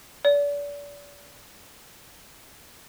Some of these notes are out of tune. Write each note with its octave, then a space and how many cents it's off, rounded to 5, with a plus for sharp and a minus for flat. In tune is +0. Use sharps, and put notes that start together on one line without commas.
D5 -35